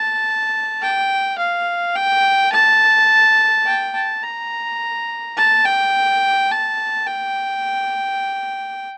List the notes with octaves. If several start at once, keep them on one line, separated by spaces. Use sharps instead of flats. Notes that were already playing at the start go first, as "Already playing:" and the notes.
Already playing: A5
G5
F5
G5
A5
G5
A5
A#5
A5
G5
A5
G5